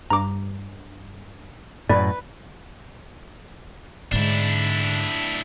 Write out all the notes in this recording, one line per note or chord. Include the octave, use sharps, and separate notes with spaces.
G2 A#5 D6
F#2 A2 B4 D5
G#2 D3 D4 E4